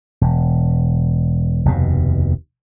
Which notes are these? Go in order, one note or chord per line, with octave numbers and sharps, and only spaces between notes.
E1
F1 D#2 B2